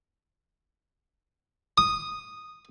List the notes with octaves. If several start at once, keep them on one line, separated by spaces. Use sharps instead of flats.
D#6